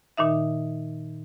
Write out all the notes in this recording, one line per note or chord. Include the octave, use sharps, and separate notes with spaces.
A#2 D#3 D#4 E5